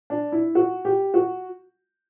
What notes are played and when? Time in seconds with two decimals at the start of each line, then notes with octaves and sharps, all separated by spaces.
0.10 D4
0.32 E4
0.55 F#4
0.85 G4
1.14 F#4